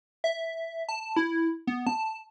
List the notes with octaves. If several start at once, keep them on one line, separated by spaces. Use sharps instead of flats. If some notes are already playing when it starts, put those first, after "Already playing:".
E5
A5
E4
B3
A5